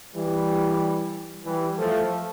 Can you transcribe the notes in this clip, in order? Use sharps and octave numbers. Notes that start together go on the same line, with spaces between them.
E3 G3
E3 G3
F3 A3